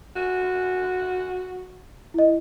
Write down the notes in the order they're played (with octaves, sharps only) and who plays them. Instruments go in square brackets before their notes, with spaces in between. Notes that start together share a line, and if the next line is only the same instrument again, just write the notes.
[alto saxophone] F#4
[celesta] E4 D#5